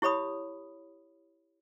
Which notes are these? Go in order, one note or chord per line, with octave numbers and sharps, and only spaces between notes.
E4 G4 C#5 B5 D#6